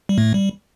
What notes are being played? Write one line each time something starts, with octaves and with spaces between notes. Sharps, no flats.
G3
A2 A3
G3